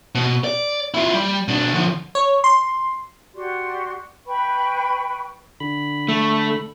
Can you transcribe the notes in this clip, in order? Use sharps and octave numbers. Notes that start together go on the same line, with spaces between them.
B2
D5
E4 F4
G3
B2 D4
D3 F3
C#5
C6
F#4 G4 D5 C6
B4 G5 B5 C#6
D3 B5
A3